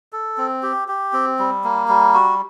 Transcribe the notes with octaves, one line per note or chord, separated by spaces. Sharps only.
A4
C4
G4
G4
C4
G3
A#3
G3
F#4